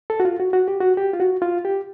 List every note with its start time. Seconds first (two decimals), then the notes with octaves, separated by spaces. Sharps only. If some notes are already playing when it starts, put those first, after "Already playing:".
0.10 A4
0.20 F#4
0.25 F4
0.40 F#4
0.53 F#4
0.68 G4
0.81 F#4
0.97 G4
1.13 F4
1.20 F#4
1.42 F4
1.65 G4